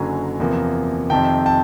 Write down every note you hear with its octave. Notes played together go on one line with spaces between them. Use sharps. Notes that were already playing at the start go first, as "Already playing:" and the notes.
Already playing: F#1 F#2 D3 F#3 G#5 A#5
E2 C3 F3 A#3
F2 C3 D#3 G5 A5
G5 A5